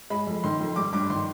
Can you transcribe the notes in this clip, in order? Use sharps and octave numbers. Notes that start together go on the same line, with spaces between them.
G#3 B5
F2
D#3 C6
F2
G3 D6
G2 D6
D#3 C6